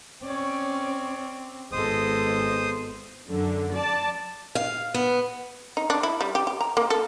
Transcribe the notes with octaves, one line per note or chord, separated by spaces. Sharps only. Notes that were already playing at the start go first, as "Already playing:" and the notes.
C4 C#4 C#5 D5
G#1 G#3 B3 A4 C5 D#6
F#2 D3
D5 A5
F5
B3
D#4
D4
E4
G3
G4
G4
A#5
A#3
A4